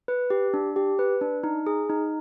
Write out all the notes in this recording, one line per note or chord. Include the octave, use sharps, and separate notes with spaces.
B4
G4
D4
G4
B4
D4
D#4
G#4
D#4